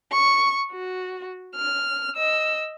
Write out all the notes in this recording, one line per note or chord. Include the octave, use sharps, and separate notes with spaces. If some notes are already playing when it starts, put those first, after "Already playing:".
C#6
F#4
F6
D#5 E6